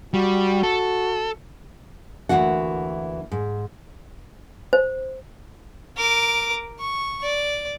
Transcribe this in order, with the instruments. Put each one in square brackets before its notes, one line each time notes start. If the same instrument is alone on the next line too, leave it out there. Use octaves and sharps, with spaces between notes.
[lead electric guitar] G3 [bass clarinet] F#4
[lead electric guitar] A4
[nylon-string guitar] D2 D#3 E3 A#3 F#4 F#5
G#2
[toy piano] C5
[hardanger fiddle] A#4 D6
C#6
D5